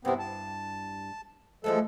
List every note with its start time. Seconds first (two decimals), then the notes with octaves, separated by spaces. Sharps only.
0.05 G2 C3 B3 C4 E4
0.19 A5
1.64 E3 F3 G#3 A3 A4 E5